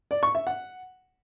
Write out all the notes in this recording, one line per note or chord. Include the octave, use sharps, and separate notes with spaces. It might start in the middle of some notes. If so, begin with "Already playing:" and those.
D5
C#6
E5
F#5